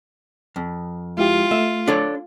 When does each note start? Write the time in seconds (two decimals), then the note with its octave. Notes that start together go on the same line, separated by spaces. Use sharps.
0.56 F2
1.18 G#3 E4 F4 G4
1.51 A3 E5
1.87 D4 A4 C#5